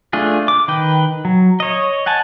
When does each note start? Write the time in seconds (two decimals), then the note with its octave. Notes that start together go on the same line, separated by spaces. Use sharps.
0.13 A3 D4 F4 G#4
0.48 D6
0.68 D#3 B4 G5
1.25 F#3
1.60 C#5 D#5
2.06 F#5 G#5 A5